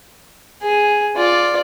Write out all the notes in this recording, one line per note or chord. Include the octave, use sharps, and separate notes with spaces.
G#4
F4 D5